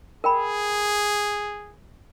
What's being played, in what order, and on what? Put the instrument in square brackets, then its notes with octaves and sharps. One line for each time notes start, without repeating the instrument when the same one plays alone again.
[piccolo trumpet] G#4 [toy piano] A#4 G5 B5